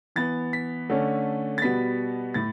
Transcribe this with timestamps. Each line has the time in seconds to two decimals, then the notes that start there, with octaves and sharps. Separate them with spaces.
0.16 E3 B3 A6
0.53 B6
0.89 D3 A3 C#4
1.58 A6
1.62 B2 G3 B3 B6
2.34 A2 A6